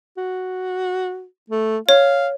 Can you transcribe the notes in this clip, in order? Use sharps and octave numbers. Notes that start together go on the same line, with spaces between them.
F#4
A3
C#5 F5